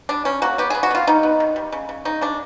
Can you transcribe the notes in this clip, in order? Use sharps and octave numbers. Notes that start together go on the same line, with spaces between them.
G3 D4
G3 C#4
A#3 F#4
B3 G4
B3 G#4
F#4
B3 F4
G3 D#4
B3
D#3
G3
C#3
C#3
C#3 D#4
C#3 D4